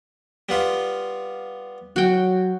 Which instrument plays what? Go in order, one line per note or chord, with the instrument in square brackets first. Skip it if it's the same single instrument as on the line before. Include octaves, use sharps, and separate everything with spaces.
[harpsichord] G3 B3 F4
[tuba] F#3 [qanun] F#4 G5